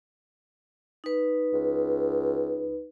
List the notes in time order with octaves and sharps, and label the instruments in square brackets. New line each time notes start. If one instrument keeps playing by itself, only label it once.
[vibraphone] D#4 B4
[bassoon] C#2